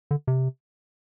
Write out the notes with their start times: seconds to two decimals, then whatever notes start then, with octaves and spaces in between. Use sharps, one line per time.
0.11 D3
0.27 C3